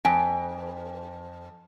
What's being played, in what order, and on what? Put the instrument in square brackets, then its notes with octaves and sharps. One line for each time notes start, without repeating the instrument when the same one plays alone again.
[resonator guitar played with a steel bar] F2 [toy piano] G#5